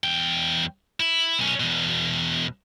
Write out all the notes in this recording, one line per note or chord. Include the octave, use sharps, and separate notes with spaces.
E2 G5
E4
B1 C#4
E2 B2